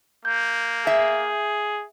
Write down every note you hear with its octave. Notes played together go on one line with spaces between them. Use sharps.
A#3 G6
G#4 E5